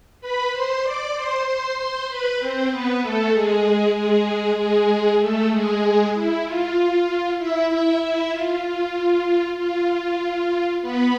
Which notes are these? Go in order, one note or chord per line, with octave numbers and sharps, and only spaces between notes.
B4 B5
C5 C6
D5 D6
C5 C6
C5 C6
C5 C6
B4 B5
C4 C5
B3 B4
A3 A4
G#3 G#4
G#3 G#4
G#3 G#4
A3 A4
G#3 G#4
E4
F4
E4 E5
E4 E5
E4 E5
F4
F4
F4
B3 B4